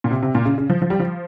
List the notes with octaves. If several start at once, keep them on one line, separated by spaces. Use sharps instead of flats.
A#2
C3
C3
A#2
C#3
C#3
F3
F3
G3
F3